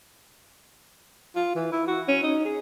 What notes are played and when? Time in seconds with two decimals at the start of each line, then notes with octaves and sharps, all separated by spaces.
1.36 F4
1.55 E3
1.72 E4
1.87 F#4
2.08 C#4
2.23 D#4
2.45 G#4